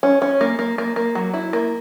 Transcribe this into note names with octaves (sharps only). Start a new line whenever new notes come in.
C#4
C#4
A#3
A#3
A#3
A#3
F#3
E4
A#3